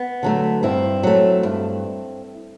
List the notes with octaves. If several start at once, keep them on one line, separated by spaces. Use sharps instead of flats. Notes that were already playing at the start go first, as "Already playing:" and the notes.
Already playing: B3
D3 F#3 A3
G2 C4 E4
F#3 A3
G2